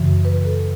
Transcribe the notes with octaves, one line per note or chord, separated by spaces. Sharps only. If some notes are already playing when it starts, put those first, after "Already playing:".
Already playing: F#2 C#3 E3
B4
A4